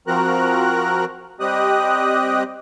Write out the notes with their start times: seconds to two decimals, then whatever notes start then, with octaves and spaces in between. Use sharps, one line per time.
0.07 F3 C4 F#4 A#4 A#5 F#6
1.40 G3 C4 G4 D#5 D#6 F#6